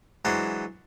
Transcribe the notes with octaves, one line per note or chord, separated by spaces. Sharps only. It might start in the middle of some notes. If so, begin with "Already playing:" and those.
E3 F#3 G#3 D4 F#4 C5